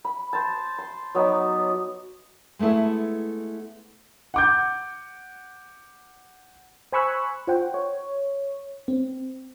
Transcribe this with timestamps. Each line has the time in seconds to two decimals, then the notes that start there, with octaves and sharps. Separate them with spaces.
0.05 B5
0.33 C5 A5
0.78 C6
1.15 F#3 B3 D#4 D5
2.59 G#3 A3 B3 E4 E5
4.34 F#5 D6 G6
6.92 C5 G#5 B5 C#6 E6 F#6
7.47 F4 C5 F#5 G5
7.74 C#5
8.88 C4